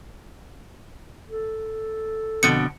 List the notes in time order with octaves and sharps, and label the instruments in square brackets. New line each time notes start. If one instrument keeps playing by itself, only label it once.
[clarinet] A4
[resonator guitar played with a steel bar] F2 B2 D3 [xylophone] C#7